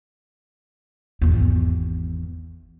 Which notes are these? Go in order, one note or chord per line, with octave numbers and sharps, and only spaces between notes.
G#1 E2